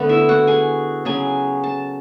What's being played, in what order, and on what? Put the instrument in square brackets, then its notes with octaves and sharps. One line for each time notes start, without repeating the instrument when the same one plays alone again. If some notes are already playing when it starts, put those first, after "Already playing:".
Already playing: [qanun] D3 A3 B3 B4
E4 E5
F#4 F#5
G#4 G#5
C#3 F#3 B3 G#4 G#5
A5